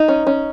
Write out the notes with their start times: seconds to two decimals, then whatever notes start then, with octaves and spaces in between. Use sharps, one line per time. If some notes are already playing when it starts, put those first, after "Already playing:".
Already playing: D#4
0.08 C#4
0.27 C#4